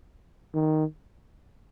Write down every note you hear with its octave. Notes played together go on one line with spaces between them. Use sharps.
D#3